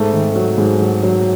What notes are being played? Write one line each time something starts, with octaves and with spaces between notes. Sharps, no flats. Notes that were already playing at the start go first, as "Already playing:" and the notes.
Already playing: G#2 A3
D#3
F#3
G#2
F#3
F#3